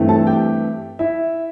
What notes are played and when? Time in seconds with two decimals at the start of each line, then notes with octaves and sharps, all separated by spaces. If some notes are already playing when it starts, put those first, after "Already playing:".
Already playing: G2 E3 A3 C4
0.09 A4 A5
0.27 G4 G5
0.99 E4 E5